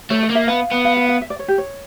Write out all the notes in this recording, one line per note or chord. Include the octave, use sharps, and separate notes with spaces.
A3 C#5
D#5
A#3
E5
B3 F5
B3
F5
F5
F5
E5
D5
C#5
G4
C#5